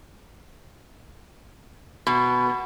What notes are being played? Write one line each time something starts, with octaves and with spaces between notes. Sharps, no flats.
B2